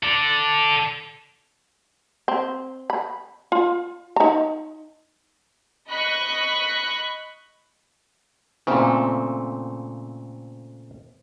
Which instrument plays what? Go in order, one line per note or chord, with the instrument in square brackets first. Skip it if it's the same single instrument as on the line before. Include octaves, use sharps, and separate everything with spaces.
[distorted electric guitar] A4 D5
[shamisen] C4
B5
F4
D#4 A#5
[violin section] D#5 B5 C#6 F#6
[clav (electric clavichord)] A#2 C#3 [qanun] A3 C4